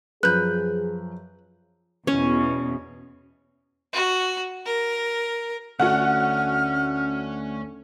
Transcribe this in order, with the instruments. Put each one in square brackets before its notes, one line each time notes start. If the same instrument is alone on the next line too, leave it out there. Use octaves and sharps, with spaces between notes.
[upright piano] F#2 F3 [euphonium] G#4 [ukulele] B4 [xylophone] F#6 G6
[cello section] E2 B2 [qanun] C#4
[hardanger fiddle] F#4
A#4
[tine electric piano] D2 A3 D4 [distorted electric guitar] C#4 G#5 [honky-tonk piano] F#4 F#5 [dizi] F6